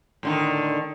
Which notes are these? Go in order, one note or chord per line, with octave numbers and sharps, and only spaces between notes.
A2 D3 D#3